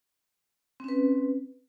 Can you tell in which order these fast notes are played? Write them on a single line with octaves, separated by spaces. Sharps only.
C4 C#4 B4